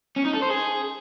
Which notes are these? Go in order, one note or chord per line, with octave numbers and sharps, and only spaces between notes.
C#4
D#4
A4
C5
G#4